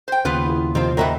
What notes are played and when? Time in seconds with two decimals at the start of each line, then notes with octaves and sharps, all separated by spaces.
0.08 C5 G5
0.25 D#2 C#3 B3 F4 B4
0.45 E4 G#4
0.75 C3 D#3 F3 C4 F4
0.97 G2 E3 F#3 A#4 D#5 E5 G5